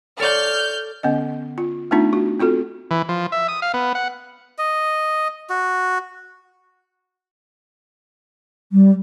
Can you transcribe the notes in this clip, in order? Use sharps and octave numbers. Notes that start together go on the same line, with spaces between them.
A4 C#5 D5 F6 G6
D3 B3 C#4 D#5
F4
A3 B3 D4 D#4 F4
F#4
C4 F4 F#4 A4
E3
F3
E5
D#6
F5
B3
F#5
D#5
F#4
G3